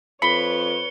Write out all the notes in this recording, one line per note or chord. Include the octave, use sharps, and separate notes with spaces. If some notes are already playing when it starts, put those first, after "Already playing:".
F2 B4 C#5 B5 C#7 G7